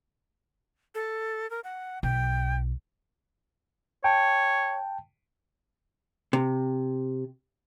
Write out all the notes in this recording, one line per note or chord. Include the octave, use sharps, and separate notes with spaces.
A4
A#4
F#5
B1 G5
C#5 G5 A5
C3